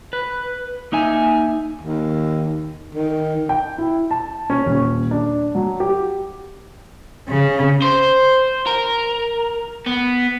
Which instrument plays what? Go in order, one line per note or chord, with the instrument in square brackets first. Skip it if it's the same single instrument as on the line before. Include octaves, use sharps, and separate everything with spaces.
[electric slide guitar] B4
A#3 D#4 E5 G#5
[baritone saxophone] D#2
D#3
[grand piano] G5
E4
A5
C#4
D#1
D4
F#3
G4
[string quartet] C#3
[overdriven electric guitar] C5
A#4
B3